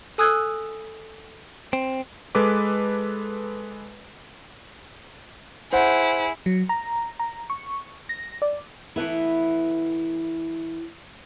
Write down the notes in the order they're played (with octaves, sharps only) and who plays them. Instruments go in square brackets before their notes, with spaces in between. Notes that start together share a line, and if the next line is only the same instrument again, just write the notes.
[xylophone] A4 G#5 D#6 E6 F#6 G#6
[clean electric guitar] C4
[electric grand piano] G#3 A4 B4 D6
[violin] E4 G#4 [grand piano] C5 F#5
[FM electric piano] F#3
A#5
A#5
C#6
A#6
D5
[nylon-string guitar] E3 A3 B3 E4